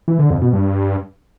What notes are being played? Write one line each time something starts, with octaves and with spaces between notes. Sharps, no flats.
E3
D3
F2
B2
G2